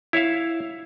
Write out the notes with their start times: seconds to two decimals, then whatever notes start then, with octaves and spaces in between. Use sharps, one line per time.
0.13 E4 C#5 E5 F5